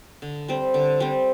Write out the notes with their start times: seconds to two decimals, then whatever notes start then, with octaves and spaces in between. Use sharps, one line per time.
0.22 D3
0.48 G3 C4
0.74 D3
1.00 G3 C4